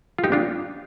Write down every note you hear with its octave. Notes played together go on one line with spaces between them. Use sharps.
F4
D#4 G4
D4 F4